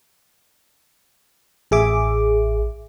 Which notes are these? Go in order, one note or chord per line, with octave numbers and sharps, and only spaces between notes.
A1 G#4 E5 D6